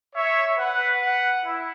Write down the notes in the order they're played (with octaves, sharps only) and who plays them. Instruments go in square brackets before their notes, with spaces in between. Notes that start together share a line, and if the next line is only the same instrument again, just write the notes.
[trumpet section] C#5 [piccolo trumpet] E5
[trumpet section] B4 [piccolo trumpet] F#5
[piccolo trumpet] F#5
[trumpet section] E4